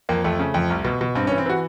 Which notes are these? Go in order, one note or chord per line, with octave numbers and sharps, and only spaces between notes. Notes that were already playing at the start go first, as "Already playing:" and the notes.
F2 A#3
F2 A3
C#3
F2
C2
B2
B2
G2 C4
C#4
E3
C4
E3 F#4